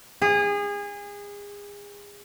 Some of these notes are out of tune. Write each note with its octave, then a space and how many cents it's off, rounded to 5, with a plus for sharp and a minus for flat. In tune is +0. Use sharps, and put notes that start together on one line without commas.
G#4 -30